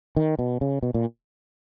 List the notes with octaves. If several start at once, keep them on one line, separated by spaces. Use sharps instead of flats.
D#3
B2
C#3
B2
A#2